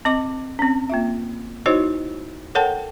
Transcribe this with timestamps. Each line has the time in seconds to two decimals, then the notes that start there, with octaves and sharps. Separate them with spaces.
0.05 C4 D#5 D6
0.59 C4 C#4
0.90 A#3 F4 E5
1.66 D#4 E4 F#4 C5 C#5 D#5
2.55 A4 A#4 C#5 F#5 G5 A5